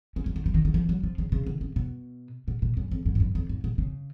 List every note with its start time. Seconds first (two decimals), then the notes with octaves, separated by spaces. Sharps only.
0.16 C#4
0.26 F3
0.36 D#3
0.46 F3
0.54 D#3
0.65 D#3
0.74 F3
0.89 F#3
1.04 F3
1.18 C#3
1.32 C#3
1.46 D#3
1.61 C#3
1.76 B2
2.48 A#2
2.62 A#2
2.77 F#2
2.91 F2
3.06 F#2
3.15 G#2
3.20 F#2
3.35 F2
3.49 G#2
3.64 A#2
3.78 C#3